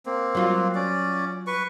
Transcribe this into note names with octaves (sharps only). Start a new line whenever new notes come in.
A#3 C4
F#3 F4
C#4 D5
B4 C#6